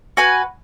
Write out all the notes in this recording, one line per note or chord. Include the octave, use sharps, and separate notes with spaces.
F#4 B4 G#5